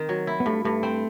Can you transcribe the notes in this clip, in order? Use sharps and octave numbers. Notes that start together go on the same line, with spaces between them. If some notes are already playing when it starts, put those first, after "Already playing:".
Already playing: D#3 C4
F#3
E4
B3
G2 A3
G2 A3
C4